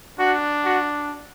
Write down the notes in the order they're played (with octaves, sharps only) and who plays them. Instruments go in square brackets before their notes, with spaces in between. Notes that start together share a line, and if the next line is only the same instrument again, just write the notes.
[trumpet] D4 [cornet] F#4
[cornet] F#4